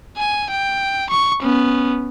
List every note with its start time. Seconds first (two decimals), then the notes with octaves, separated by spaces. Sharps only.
0.17 G#5
0.50 G5
1.10 C#6
1.42 B3 C#4